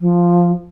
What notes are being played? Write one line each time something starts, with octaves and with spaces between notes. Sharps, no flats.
F3